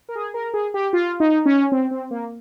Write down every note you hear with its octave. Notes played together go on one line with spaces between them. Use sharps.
A#4
G#4
A#4
G#4
G4
F4
D#4
C#4
C4
C4
A#3